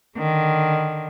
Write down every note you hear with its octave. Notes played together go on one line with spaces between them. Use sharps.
D3 D#3